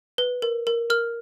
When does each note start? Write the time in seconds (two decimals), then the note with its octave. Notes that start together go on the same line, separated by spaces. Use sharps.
0.18 B4
0.42 A#4
0.67 A#4
0.90 A#4 F6